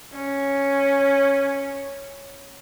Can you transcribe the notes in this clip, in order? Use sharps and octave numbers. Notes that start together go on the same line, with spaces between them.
C#4